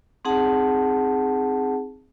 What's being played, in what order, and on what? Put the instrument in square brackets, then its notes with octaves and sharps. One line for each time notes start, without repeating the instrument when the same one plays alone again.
[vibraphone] C4 D#4 G#4 F#5 A5